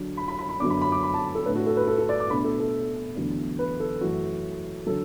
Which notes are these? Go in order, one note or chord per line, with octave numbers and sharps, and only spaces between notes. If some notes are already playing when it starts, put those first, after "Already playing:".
Already playing: D3 F#3 D4
B5
B5
B5
B5
F#2 D3 B3 D4 D6
B5
B5
D6
B5
A5
A4
A2 A3 D4 B4
F#4
A4
B4
A4
A4
D5
D6
B2 A3 D4 B5
A4
A4
E2 D3 F#3 A3 D4
B4
A4
F#2 E3 A3 F#4
D3 F#3 A4